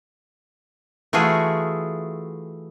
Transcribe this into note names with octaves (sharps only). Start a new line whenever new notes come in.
E3 A3 F4 F#4 G#4